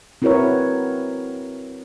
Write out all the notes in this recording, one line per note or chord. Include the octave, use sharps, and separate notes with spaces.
C4 E4 F#4 A#4 B4 C#5